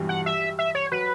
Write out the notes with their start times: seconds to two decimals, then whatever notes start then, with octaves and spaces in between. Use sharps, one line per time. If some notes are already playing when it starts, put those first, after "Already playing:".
Already playing: G2 B2 E3 G3
0.09 F#5
0.26 E5
0.59 E5
0.75 C#5
0.91 F#3 B4